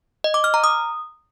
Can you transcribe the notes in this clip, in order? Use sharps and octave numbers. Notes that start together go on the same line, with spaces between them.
D#5
D6
F6
A#5
D#6